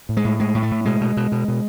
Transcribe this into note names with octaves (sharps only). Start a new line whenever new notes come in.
A2
G#3
A2
A2 G#3
A2
A3
A2
B2 G#3
B2
B2
B2
B2